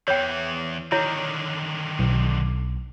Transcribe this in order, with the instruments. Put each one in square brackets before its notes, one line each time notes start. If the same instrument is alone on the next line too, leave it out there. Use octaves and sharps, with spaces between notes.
[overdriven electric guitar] E2 E3 [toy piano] C#5 G5
[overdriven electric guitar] D3 D#3 [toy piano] E4 C#5
[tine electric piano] B1